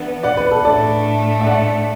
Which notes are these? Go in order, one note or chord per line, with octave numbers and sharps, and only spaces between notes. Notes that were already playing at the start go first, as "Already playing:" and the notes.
Already playing: E3 B3 D4
D5 F#5
B4
A4
A2 A3 D4 A4 D5
E5
D5 F#5